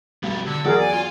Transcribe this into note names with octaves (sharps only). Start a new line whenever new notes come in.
B1 F2 G3
D3 E6
E2 F#3 G#4 A#4 D5 F#5
G#5
F4